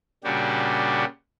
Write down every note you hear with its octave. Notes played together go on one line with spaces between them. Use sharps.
A#2 C#3 G3 D4 F#4 G4